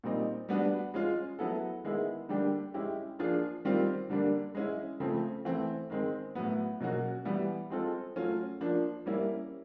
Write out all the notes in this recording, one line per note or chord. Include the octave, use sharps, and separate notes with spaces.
A#2 G3 C4 D#4
G3 B3 D4 F#4
G#3 C#4 F4
F#3 B3 E4 A4
D#3 G#3 B3 E4 G#4
D3 G3 A#3 D4 G4
G#3 C#4 E4 G4
F3 A#3 D4 F4 G#4
D#3 G3 C4 F4
D3 G3 A#3 D4
G#3 C#4 E4
C#3 F3 A3 C4
E3 A3 C4
D#3 G#3 C4
A2 F#3 B3
B2 F#3 A#3 C#4 F#4
E3 G3 B3
G#3 C4 F4 A4
F#3 A3 C#4 F4
F3 A#3 D4
G3 A#3 C#4 E4